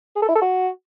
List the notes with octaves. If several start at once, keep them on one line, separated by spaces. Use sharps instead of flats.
G#4
A4
E4
A4
F#4